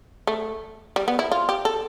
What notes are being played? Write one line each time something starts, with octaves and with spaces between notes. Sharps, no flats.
A3
G3
B3
E4
F4
G4
A4